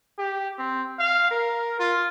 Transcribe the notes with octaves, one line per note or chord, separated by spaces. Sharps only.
G4
C4
F5
A#4
F4